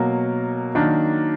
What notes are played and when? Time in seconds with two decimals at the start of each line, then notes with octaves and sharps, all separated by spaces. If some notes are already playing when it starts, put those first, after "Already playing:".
Already playing: B2 F#3 A#3
0.75 D#3 F#3 A#3 D4